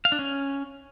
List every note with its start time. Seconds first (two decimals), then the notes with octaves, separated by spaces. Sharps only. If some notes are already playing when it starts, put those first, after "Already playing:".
0.05 F5
0.12 D4
0.19 C#4